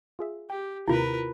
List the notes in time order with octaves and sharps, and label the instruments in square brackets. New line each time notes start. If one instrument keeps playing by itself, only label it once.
[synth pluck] F4 G#4 E5
[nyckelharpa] G4 [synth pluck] G5
[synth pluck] D#2 C3 [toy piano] E4 F4 [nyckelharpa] A#4 B4